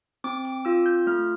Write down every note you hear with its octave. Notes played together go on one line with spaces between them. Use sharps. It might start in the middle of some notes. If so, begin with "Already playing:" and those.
C4 D6
D6
F4 E6
G6
A3 F6